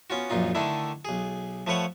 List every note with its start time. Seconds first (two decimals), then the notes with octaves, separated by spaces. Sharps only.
0.10 B3 C#4 F4 F#4
0.30 A#1 F#2 A#2 D#4 F4
0.55 D3 D#3 A3 D4 E4
1.05 B1 G#4
1.67 F3 A3 B4 C#5 F#5